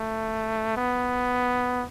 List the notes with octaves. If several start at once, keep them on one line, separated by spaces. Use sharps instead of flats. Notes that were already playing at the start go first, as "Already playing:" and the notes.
Already playing: A3
B3